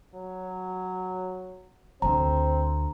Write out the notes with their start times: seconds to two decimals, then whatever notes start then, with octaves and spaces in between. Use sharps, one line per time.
0.14 F#3
2.02 D2 D3 C4 A#5